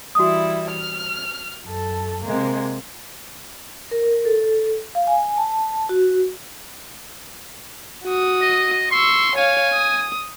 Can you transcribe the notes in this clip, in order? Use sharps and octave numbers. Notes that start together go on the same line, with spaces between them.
E3 G3 E4 F#4 D#6
F6
F#2 A4
C3 G#3 A#3
A#4
A4
F5
G#5
A5
F#4
F#4 D#6
D#5
C6 C#6 E6
C#5 F5 G#5
D#6